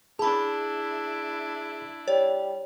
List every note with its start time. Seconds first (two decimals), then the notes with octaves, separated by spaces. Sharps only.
0.19 D4 E4 G#4 A5 B5
2.08 G3 C#5